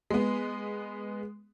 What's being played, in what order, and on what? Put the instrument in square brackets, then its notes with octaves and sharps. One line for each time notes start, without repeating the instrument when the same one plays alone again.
[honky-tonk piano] G#3 B3